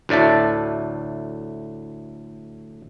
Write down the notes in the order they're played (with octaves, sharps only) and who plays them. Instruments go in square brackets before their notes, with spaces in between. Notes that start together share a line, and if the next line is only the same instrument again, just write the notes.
[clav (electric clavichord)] D2 A2 D5 E5 A5